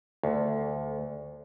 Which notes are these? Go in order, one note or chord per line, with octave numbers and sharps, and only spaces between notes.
D2